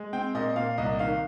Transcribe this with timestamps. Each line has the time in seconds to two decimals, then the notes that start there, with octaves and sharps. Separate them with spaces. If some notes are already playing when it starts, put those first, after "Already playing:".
Already playing: G#3
0.13 C4 G5
0.35 A#2 D#5
0.56 A#2 F5
0.78 C2 D#5
0.99 D#3 F5